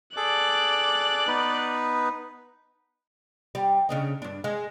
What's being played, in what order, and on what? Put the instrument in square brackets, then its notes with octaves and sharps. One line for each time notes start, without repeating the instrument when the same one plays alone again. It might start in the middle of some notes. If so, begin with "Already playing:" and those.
[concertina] G#4 A4 D6 [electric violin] D5 F#6
[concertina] B3 D#4 B4
[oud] G3
C#3 D4 D#4
G2 D4
G#3